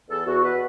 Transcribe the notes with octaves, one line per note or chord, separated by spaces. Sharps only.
E2 A4
E2 F#4
B2 B4